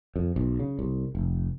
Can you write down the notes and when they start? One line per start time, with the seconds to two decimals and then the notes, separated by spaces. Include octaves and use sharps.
0.16 F2
0.36 B1
0.60 C#3
0.79 C2
1.15 F1